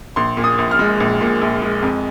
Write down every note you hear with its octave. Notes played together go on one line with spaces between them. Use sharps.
A#1 C6
A#2
D#6
A#1
F6
G#3
A#1
A#2
A#1
G#3
F2